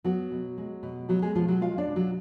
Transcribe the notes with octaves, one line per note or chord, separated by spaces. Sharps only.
F#3 B3 F#4
B2
G#3
B2
F#3 B3 F#4
G#3 G#4
B2 F3 F4
F#3 F#4
G#3 F4 F5
D4 D5
B2
F#3 F#4